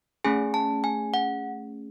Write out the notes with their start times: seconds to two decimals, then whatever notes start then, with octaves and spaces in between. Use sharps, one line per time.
0.25 A3 C#4 G#4 G#5
0.54 A5
0.84 G#5
1.14 F#5